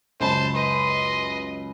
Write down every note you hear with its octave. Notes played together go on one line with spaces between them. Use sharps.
C#2 F#2 C5 A5 B5
B4 D#5 C6